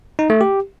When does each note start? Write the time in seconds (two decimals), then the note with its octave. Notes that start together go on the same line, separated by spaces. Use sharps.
0.19 D#4
0.30 A3
0.41 G4